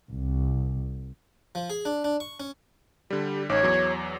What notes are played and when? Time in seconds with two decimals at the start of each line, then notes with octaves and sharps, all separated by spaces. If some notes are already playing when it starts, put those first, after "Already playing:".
0.12 C2
1.55 F3
1.70 G#4
1.85 D4
2.04 D4
2.20 C#6
2.40 C#4
3.10 D3 G3 G4
3.49 A1 D#4 C#5 D6
3.63 E2 F#3